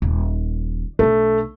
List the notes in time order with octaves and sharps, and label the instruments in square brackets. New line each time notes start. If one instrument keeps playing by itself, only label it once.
[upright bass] D#1
[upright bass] B1 D4 [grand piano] A3